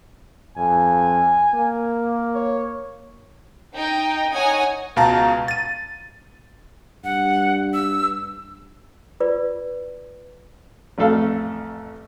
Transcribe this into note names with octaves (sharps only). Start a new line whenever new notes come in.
F2 G#5
A#3
C#5
D#4 G5
D#4 C#5 F#5 G#5 D#6
C#2 B2 F5 A5 A#5
A6 D#7
G2 F#5
E6
F4 B4 D5
A1 F2 A3 A4 F5 E6